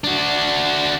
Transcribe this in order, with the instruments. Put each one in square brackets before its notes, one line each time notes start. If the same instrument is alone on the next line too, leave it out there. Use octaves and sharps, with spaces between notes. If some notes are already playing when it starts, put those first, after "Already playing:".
[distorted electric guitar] D4 F#4